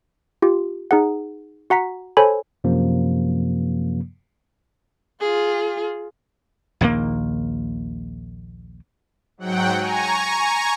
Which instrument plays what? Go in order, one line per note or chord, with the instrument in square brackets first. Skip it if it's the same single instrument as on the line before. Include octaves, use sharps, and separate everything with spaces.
[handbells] F4 G4
D#4 G#4 F#5
F#4 F#5 A#5 B6
A4 C5 C#5 G#5 B5
[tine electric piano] F#2 C3 F3 A#3
[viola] F4 G#4
[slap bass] A#1 D#2 D#3 A#3
[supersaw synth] G#2 F#3 F#5 G5
G#5 A#5 C#6